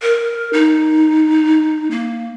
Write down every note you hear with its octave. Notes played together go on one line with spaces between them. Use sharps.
A#4
D#4
A#3